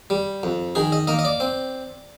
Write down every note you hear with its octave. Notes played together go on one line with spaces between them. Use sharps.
G3
F2
D#3 G#4
D#5
A#3 D#5
D#5
D5
C4